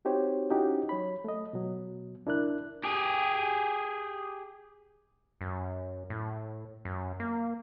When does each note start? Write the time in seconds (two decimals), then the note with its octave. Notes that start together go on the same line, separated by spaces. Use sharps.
0.05 C4 D#4 F#4 G4 C5 C#5
0.50 C#4 D#4 E4 F#4 G4
0.89 F#3 C#5 B5
1.24 A3 D#5
1.53 B2 F#3
2.26 C#2 D4 E4 A#4 D5 F#6
2.84 G4 G#4
5.41 F#2
6.10 A2
6.85 F#2
7.20 A#3